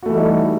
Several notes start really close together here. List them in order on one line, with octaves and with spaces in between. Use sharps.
F#4 A3 E3 G3 D#4